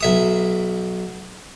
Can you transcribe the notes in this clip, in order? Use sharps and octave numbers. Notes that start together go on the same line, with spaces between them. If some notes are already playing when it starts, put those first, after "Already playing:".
B1 E5 D#6